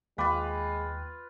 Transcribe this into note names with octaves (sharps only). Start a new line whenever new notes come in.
D#2 G#3 F4 B4 F5 G5 D6